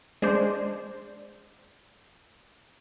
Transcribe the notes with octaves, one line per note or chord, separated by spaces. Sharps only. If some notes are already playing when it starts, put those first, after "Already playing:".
G#3 D4 C5 D5